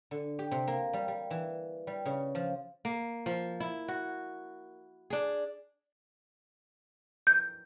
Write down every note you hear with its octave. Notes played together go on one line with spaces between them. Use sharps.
D3
G4
C3
A#3
G3
G3
E3
G3
C#3
F3
A#3
F3
E4
F#4
D4 G#4
G6